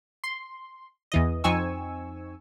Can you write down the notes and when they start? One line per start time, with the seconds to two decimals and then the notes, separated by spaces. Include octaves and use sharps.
0.24 C6
1.12 E2 E3 D#5
1.44 F2 C4 D#4 G#5 C#6 E6